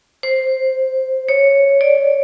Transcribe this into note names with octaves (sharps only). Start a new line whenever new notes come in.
C5
C#5
D5